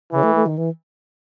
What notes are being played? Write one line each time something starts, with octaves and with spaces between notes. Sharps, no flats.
C#3 E3
A3
A3
D#3
E3